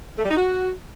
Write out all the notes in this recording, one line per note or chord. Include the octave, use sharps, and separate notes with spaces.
A3
G3
D#4
F#4